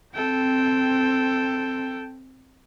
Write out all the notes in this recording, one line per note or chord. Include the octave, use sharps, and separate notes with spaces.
C4 A4 G5